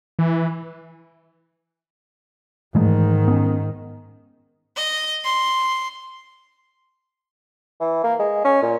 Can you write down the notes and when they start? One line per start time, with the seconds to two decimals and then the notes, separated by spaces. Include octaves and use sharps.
0.19 E3
2.75 G#2 D#3 E3 G#3 A3
3.28 B3 C#4
4.77 D#5
5.25 C6
7.80 E3
8.04 A#3
8.19 G#3
8.45 C#4
8.62 A#2